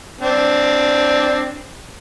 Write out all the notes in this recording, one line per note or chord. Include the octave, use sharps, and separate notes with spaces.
C4 D4